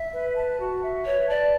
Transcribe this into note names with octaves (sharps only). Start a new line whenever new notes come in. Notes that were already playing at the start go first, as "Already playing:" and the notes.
Already playing: E5
B4
A5
F#4
E5
B4 C#5
D5 A5